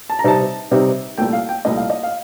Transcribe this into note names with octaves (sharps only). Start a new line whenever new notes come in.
A5
A#5
C3 G3 C4 D#4 A5
C3 G3 C4 D#4
C2 A#2 A3 G5
F5
G5
C2 A#2 A3 D#5
F5
D#5
F5